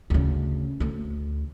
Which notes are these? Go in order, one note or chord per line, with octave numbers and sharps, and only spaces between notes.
D2 C#3
D2 A3